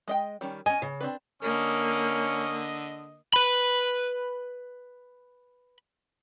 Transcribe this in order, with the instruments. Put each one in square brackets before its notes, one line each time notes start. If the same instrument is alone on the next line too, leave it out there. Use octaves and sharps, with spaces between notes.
[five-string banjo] G#3 D#5 G5
D#3 G3 C#4
[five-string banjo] C#4 D#5 [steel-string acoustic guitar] G#5
[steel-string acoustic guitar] C#3
[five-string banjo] C4 D4 B4
[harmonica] D3 D#5 D#6 [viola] A#3 [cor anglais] C#4
[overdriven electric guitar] B4 B5